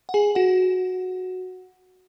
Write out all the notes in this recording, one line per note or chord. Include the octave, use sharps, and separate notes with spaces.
F#5
G#4 G#5
F#4 F#5